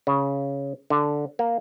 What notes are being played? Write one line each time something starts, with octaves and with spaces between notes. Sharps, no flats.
C#3
D3
A#3